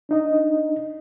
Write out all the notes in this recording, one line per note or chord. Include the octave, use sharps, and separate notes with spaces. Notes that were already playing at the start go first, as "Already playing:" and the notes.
D4 D#4 D#5